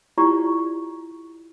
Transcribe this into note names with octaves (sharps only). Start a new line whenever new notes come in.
E4 F4 G4 D5 A#5 C#6